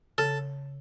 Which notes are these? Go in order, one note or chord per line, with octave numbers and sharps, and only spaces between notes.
C#3 A4